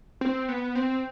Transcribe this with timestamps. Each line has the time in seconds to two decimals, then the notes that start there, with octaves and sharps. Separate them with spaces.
0.21 C4
0.48 B3
0.75 C4